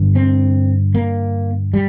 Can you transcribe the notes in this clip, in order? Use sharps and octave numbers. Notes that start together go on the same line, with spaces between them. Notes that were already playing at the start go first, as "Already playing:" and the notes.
Already playing: G2 D3
C4
A#3
G3